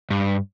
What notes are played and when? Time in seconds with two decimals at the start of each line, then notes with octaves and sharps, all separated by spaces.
0.10 G2